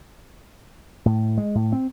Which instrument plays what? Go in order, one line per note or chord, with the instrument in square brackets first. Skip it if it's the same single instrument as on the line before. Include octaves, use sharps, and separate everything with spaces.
[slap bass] A2
G#3
A2
C4